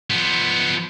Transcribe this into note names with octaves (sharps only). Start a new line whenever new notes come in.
F3 B3